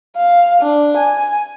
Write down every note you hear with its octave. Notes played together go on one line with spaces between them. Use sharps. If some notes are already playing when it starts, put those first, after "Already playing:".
F5
D4
G#5